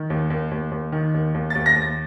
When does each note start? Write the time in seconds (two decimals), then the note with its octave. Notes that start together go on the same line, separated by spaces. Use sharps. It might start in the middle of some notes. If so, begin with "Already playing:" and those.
Already playing: D#3
0.10 D#2
0.30 D#2
0.51 D#2
0.71 D#2
0.92 D#3
1.14 D#2
1.34 D#2
1.50 D#2 A6
1.66 A#6
1.76 D#2
1.82 A6